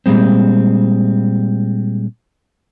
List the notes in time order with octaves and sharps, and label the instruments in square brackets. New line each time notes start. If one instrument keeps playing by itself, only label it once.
[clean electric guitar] A#2 G3 G#3 C4